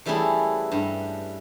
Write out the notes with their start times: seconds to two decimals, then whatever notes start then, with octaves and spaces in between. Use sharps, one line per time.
0.06 E3 G3 A3 C#4 E4 G#4
0.72 G2